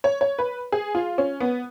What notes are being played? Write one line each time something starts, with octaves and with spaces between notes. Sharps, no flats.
C#5
C#5
B4
G#4
F4
C#4
B3